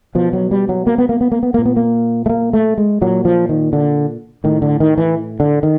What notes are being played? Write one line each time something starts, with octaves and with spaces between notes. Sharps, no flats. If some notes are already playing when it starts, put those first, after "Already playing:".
B2 F3
F#3
G3
F#3
A#3
B3
A#3
B3
A#3
B3
A#2 A#3
B3
A#3
A3
A#3
A3
G#3
A#2 F#3
F3
D#3
D3
A2 D#3
D3
D#3
E3
D3
D#3